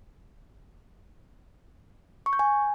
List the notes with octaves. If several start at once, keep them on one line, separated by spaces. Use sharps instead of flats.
C#6
G6
G#5